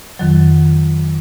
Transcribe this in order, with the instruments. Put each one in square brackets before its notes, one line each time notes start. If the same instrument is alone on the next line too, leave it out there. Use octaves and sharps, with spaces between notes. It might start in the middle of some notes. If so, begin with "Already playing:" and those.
[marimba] F2 D#3 F#3